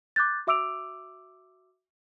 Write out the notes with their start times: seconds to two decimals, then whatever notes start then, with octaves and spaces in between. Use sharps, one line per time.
0.16 D6 F#6 G6 A6
0.47 F#4 E5 D6 E6 D7 F7